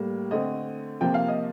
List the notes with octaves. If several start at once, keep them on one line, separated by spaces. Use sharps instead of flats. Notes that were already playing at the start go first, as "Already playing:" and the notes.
Already playing: A2 G3 A#3
D3 A3 C4 D#5
C3 F3 A#3 G5
F5
D#5